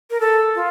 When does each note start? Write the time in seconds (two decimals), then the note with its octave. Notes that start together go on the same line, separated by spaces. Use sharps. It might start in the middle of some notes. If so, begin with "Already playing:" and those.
0.11 A#4
0.20 A4
0.55 F4